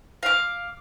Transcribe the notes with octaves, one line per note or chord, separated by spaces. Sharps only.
F5 D6